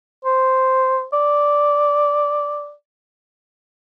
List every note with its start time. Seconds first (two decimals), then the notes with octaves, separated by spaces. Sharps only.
0.25 C5
1.13 D5